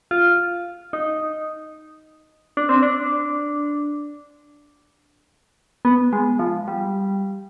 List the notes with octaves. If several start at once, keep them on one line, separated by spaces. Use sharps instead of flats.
F4
D#4
D4
C4
D4
B3
G#3
F3
G3